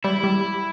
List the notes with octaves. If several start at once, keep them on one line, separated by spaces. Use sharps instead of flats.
G3 E4
G3